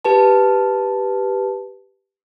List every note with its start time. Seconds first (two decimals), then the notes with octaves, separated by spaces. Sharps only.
0.05 G4 B4 A5